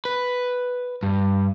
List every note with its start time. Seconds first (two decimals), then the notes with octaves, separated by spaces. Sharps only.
0.05 B4
1.03 G2